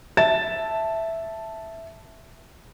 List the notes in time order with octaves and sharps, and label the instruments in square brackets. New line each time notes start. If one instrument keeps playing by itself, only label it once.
[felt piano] E5 A5 A6 E7